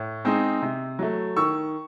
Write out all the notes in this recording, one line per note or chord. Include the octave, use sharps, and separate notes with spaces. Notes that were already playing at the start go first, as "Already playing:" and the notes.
Already playing: A2
G#3 C4 D#4
C3
F#3 A3
D#3 C#6 E6